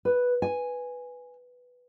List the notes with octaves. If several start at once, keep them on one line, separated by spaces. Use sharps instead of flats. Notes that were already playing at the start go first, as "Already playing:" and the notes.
B4
G#5